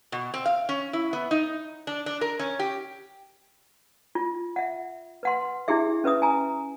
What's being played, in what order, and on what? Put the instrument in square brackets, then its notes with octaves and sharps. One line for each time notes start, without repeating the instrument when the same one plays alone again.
[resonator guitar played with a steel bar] B2
C4
F5
C#4
E4
B3
D#4
D4
D4
A#4
C#4
G4
[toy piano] F4
E5 F#5
B4 F#5 C6
D4 E4 G4 G#4 E5
C#4 B4 E5 D#6
G#5 A#5